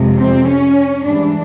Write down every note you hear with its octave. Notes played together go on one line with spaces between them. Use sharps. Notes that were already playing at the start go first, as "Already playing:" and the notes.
Already playing: F2 C3 F3 G#3
C4
C#4
G#2 E3 G3 D4